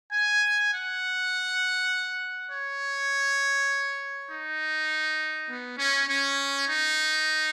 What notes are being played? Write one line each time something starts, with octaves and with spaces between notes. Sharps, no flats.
G#5
F#5
C#5
D#4
B3
C#4
C#4
D#4